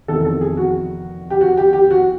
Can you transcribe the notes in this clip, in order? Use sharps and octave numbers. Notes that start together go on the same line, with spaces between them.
F1 E2 C3 D#3 A4
A4
G#4
F#4
G4
F#4
G4
G4
F#4